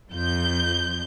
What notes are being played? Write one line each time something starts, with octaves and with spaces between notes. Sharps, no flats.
F2 G6